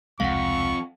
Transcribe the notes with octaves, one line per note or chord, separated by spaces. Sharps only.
E1 C2 F2 G#3 F5 F#5 C#6